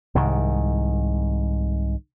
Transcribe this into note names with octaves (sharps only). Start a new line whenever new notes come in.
C2 G#2 D#3